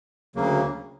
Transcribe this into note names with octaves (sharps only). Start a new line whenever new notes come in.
D2 C#3 F#3 A#3